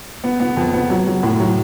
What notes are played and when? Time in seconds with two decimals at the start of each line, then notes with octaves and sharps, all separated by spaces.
0.24 B3
0.40 B3
0.57 F2
0.74 B3
0.90 F#3
1.07 F#3
1.23 A2
1.40 F#3